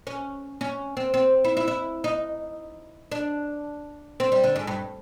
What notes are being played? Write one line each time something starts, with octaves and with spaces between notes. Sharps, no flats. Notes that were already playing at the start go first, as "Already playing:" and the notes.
C#4
C#4
C4
C4
E4
E4
E4
D#4
D4
C4
G3
D3
G#2
G2